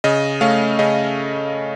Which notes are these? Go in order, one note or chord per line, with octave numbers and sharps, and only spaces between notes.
C#3 D#5
A3 C#4 F5
C#3 D#5